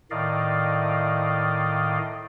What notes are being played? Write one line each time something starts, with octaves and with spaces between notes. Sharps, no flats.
A2 D#3 D5 D#5 F5